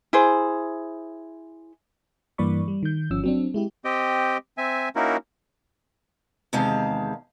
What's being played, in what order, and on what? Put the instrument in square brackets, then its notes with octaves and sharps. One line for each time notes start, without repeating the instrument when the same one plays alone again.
[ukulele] E4 G#4 C5
[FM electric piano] G2 E3 A#3 D5 B5 C#6
G3
D#3 G6
G1 F3 C#4 E6
F#3 C4 D4
G#3 E4 G4
[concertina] C4 G4 D#5 G5
C4 E5 G#5
A#3 C#4 D#4 E4 F#4 A#4
[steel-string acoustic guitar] E2 C3 D#3 G#3 F5 A5